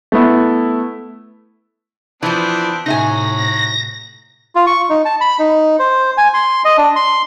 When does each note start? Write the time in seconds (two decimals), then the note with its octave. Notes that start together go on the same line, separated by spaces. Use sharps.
0.12 A3 B3 E4
2.23 E3 F3 B3 C4 D4
2.86 A2 C3 F#3 D#4 E5 G#5 A#6
4.55 F4
4.67 C#6
4.90 D#4
5.05 A5
5.21 B5
5.39 D#4
5.79 C5
6.17 G#5
6.34 C6
6.65 D#5
6.77 D4
6.96 C6